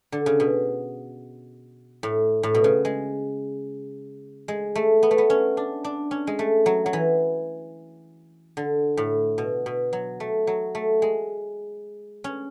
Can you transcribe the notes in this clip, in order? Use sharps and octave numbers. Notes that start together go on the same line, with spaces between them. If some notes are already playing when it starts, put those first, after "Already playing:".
D3
C#3
B2
A2
A2
B2
C#3
G#3
G#3
A3
B3
A3
B3
C#4
D4
D4
C#4
G#3
A3
F#3
F#3
E3
D3
A2
B2
B2
F#3
A3
F#3
A3
G#3
C#4